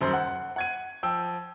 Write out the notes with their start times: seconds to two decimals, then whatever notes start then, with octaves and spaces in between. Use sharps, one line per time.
0.01 D#1 F#2 C5
0.14 F#5
0.56 F#5 G#6 D#7
1.03 F3 G5 E6